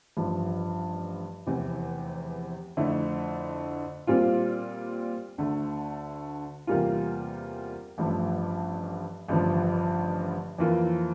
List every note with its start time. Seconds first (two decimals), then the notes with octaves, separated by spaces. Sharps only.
0.17 A1 G2 F3
1.46 F1 E2 C3 E3
2.77 F2 D3 A3 E4
4.07 A#2 G3 C4 F4
5.38 D2 D3 A3
6.67 E2 C3 G3 A#3 F4
7.98 A1 G2 F3 A3
9.28 A1 G2 D3 F3
10.58 F2 E3 A#3 F4